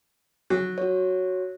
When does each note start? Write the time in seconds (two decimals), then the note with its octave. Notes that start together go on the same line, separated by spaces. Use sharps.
0.50 F#3
0.78 F#4 C#5